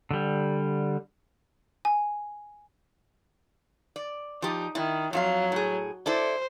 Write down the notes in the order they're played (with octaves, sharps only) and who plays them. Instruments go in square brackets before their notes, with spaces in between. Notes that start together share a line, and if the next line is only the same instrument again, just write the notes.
[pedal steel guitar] D3 G3
[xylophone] G#5
[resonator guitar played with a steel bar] D5
[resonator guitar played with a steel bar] F3 G4 [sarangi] D#4
[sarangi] D#3 [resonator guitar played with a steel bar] E4
[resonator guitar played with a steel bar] F2 F4 F5 [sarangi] F#3
[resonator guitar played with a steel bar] A2 G#4
[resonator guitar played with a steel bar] E4 A4 D5 [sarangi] C5